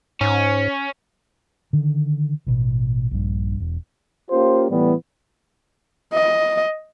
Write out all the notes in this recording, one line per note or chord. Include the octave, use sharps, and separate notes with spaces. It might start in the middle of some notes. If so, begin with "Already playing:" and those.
G#2 C#4
D3 D#3
A1 B2
A#1 G2
E1
A#3 C#4 F4 G4 C5
A2 E3 G3 B3
D#5